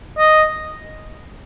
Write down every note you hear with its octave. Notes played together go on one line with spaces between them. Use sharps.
D#5